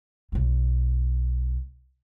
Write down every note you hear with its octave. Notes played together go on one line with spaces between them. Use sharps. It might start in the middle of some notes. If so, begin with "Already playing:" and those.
B1 G#3